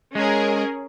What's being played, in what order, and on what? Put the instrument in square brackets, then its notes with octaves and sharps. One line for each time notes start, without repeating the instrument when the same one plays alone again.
[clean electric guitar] G#3 [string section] C#4 G#4 A#4